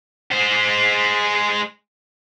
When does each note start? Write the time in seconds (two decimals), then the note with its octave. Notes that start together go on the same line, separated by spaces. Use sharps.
0.32 G#3 C5